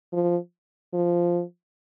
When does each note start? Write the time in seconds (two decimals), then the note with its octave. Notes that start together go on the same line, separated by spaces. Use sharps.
0.13 F3
0.94 F3